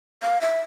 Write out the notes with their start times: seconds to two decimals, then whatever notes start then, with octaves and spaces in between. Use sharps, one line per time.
0.22 F5
0.41 E5